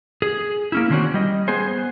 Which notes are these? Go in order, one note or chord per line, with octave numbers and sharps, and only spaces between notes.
G#4
A#3 C#4 E4
D3 D#3 C4 C#4 F#4 D5
G3 D#5
B3 G#4 C5